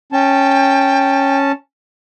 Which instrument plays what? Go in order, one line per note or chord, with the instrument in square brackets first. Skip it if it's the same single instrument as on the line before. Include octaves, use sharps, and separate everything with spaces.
[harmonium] C#4 A5 [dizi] G5